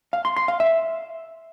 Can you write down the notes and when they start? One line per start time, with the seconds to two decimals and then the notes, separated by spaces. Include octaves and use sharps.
0.13 F5
0.25 C6
0.36 C6
0.48 F5
0.60 E5